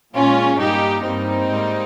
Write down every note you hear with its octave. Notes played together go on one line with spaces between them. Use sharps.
A#2 G#3 C#4 F4
G2 G3 A#3 D#4 G4
G2 G3 A#3 C4 D#4
G#2 G3 A#3